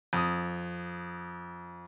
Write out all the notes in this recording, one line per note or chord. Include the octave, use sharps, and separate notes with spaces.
F2 D#6